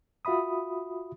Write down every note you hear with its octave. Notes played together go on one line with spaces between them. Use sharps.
F4 F#4 E5 B5 D#6